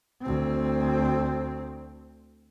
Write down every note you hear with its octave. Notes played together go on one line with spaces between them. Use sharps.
D2 C4